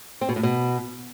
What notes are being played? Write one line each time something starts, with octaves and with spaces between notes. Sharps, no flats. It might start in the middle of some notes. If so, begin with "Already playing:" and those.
C4
B2
A2
B2